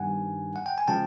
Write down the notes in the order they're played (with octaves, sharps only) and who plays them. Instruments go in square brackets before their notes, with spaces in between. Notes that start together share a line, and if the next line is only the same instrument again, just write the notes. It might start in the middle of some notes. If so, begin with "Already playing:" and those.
Already playing: [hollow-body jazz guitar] G2 D#3 G3 B3 [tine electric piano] F#5 G#5
[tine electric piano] F#5
G5
G#5
[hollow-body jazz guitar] C#3 F3 G#3 [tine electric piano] G5 A5